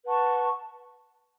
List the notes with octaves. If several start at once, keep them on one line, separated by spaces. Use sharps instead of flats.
B4 F#5 A5 C#6